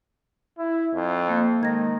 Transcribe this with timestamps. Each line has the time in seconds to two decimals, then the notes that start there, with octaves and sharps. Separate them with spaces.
0.58 E4
0.93 F2
1.29 A#3
1.61 D#3 G#3 G#6 A#6